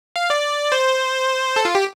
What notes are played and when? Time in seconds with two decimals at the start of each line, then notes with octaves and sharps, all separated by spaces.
0.16 F5
0.30 D5
0.72 C5
1.56 A4
1.65 F4
1.75 G4